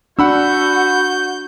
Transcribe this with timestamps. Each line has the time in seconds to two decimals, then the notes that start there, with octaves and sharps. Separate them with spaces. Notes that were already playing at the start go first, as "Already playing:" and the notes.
0.19 D4 F#4 F#5 B5 E6 G6